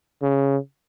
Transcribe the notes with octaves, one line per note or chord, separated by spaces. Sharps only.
C#3